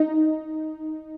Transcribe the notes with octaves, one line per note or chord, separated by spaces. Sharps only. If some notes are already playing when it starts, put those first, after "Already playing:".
Already playing: D#4